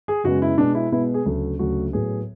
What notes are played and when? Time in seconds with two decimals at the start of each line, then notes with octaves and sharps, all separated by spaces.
0.08 G#4
0.24 F#2 C#3 G#3 B3 F#4
0.42 E4
0.58 B2 G#3 B3 D4
0.75 E4
0.92 B2 G#3 B3 E4
1.14 G#4
1.25 D2 C#3 F#3 A3
1.59 D2 C#3 F#3 A3 F#4
1.92 A2 F#3 B3 G#4